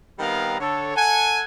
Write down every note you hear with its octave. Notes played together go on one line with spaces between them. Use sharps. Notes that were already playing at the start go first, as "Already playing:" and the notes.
D#3 G3 B3 C4 F5 A#5
D3 A4 C#5
A4 F#5 G#5